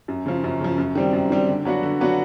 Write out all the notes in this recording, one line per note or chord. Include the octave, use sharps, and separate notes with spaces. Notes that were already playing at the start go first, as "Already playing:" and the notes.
F#2
C#3 F3
F#2
C#3 F3
F#2
D#3 G3 C4
F#2
D#3 G3 C4
D3
F#3 B3 D4 F#4
D3
F#3 B3 D4 F#4